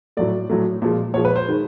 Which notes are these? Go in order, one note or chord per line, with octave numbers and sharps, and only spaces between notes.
A2 F#3 A3 D5
A2 F#3 A3
A#2 F3 G#3
A#2 F3 G#3 C#5
B4
C5
D#3 G#3